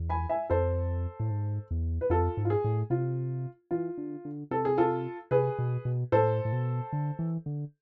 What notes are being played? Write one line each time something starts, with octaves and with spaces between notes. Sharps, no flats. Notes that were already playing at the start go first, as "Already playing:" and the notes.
Already playing: E2
G#5 B5
E5 G#5
F2 A4 C5
A2
G#2
E2
B4
F2 F4 A4
G#2
F4
G#4
A2
C3 F4
E3 F4
D3
D3
C3 A4
G#4
F4 A4
C3 G#4 B4
B2
B2
A2 A4 C5
A2
B2
D3
E3
D3